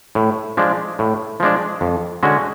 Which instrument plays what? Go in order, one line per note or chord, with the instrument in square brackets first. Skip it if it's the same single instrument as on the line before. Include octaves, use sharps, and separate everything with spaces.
[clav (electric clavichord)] A2
F3 G#3 D4
A2
F3 G#3 D4
F2
D3 G#3 C#4 F#4